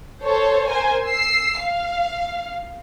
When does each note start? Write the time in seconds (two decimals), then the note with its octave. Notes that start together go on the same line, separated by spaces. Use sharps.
0.23 A4 C5 C#5
0.68 A#4 C5 G#5
1.06 E6 C7
1.61 F5